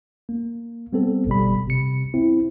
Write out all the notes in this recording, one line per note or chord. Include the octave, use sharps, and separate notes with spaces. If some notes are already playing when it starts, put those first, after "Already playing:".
A#3
G3 B3 C4 A4
G1 B2 G3 B5
C3 C#7
C4 E4